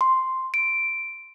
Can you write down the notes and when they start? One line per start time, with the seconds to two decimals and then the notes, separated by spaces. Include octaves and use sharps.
0.01 C6
0.54 D7